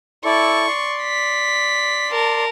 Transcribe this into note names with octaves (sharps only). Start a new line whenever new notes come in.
E4 A4 D5 C#6
D5 C6
B6
A#4 A5